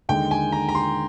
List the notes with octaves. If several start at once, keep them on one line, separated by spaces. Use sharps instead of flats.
D#2 D3 G#3 G5
G#5
A#5
A#5
C6